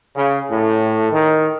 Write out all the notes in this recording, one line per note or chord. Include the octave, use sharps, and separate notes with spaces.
C#3
A2
D#3